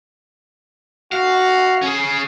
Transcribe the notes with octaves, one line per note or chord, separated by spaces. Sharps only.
F#4 F5
C#4 G#4